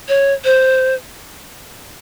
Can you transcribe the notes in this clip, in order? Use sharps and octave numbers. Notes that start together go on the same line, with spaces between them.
C#5
C5